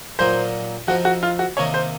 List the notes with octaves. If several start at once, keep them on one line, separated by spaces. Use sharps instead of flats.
A#2 F#3 A#3 D#4 C5
F3 C4 D#4 F#4
F#4
F4
F#4
C3 D#3 A#3 D#4 C#5
C5